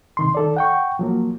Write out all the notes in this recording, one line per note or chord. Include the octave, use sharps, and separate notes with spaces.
C3 D#3 C6
D#3 A4 D5
F#5 G5 C#6
F3 F#3 A#3